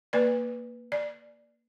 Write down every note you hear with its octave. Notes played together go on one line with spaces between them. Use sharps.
A#3 B4 D5
D5